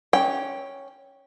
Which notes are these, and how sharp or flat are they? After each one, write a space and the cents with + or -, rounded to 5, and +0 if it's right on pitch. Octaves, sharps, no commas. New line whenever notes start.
C#4 +0 G5 +0